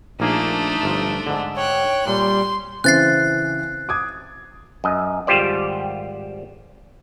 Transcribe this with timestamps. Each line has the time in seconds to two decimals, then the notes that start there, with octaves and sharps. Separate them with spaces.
0.20 A#1 A3 A#3 D4 D#4 G#4
0.83 G1 F3
1.27 G#2 D3
1.56 C#5 G5 F#6
2.07 A#2 G3 C6
2.84 C#3 E3 C4 F#6 A6 C7
3.89 D6 D#6 G#6
4.84 F#2 D#5
5.27 G#1 G3 F4 G4 C5 D5